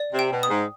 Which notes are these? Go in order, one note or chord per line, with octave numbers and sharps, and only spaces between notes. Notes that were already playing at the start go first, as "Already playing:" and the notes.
Already playing: D5
C3
G5
B2
D#6
G#2